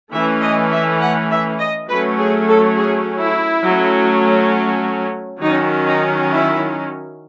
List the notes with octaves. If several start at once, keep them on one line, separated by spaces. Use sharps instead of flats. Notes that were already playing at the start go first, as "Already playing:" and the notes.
E3 A3 C#4 E5
D#5
E5
F#5
E5
D#5
F#3 A3 C#4 B4
G#4
A4
G#4
E4
F#3 A3 C#4
D#3 F#3 C#4 D#4
D#4
E4